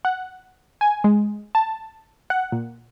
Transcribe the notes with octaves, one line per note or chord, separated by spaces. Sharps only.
F#5
G#5
G#3
A5
F#5
A#2